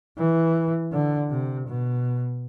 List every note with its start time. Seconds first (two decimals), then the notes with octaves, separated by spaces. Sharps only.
0.18 E3
0.92 D3
1.30 C3
1.68 B2